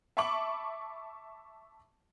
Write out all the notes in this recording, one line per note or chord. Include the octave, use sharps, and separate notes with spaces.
E5 A5 B5 C#6 D6 F#7